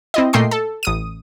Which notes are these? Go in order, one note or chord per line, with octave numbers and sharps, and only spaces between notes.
C4 E4 D#5
A#2 A3 D#5 G5 C6 C7
A4
A1 D#6 D#7